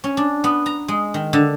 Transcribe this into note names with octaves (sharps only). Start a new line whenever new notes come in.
C#4
D4
B3
A#5
G#3
D#3
D3